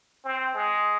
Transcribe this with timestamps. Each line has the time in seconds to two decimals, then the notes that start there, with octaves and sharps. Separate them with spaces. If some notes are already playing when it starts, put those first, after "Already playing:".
0.24 C4
0.54 G#3